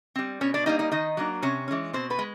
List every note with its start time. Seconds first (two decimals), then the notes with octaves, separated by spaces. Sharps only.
0.16 G3 C4
0.41 B2 C#4 C#5
0.54 D4 D5
0.66 G3 A#3 D#4 D#5
0.79 D#4 D#5
0.92 D#3 D#4 D#5
1.17 F#3 A#3 D4
1.42 C3 C#4 C#5
1.68 E3 G#3 C#4
1.93 B2 C4 C5
2.10 B3 B4
2.19 G#3